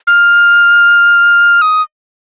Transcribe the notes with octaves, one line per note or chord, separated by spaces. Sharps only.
F6
D#6